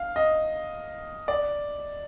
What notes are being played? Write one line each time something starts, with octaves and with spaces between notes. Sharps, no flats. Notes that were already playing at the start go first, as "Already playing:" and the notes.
Already playing: F5
D#5
D5